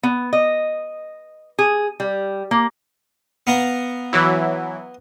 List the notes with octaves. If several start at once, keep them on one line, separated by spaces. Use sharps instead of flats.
B3
D#5
G#4
G3
A#3
B3 F5 A#5
E3 F#3 E4